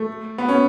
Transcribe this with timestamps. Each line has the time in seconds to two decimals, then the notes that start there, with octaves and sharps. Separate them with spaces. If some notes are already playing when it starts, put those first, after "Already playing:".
Already playing: A3
0.38 B3
0.48 C#4